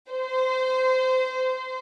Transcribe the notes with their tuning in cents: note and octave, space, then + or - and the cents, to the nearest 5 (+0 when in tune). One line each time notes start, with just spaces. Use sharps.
C5 -20